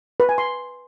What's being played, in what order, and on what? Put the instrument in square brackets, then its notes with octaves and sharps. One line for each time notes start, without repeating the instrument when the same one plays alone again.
[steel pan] B4
G#5
C6